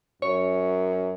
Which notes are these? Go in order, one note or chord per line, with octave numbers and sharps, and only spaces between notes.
F#2 C#5